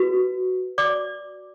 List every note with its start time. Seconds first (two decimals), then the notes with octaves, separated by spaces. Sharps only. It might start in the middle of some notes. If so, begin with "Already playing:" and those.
Already playing: F#4 B4
0.78 D5 D6